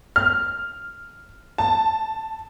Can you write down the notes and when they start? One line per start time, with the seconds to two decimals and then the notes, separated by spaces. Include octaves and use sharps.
0.16 F6
1.58 A5